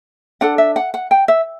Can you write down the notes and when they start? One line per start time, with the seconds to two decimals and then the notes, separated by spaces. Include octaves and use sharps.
0.41 D4 A4 F#5
0.58 E5
0.76 F#5
0.94 F#5
1.11 G5
1.28 E5